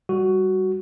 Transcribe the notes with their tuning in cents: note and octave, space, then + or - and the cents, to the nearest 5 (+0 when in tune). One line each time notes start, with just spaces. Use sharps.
G3 +0 F#4 +10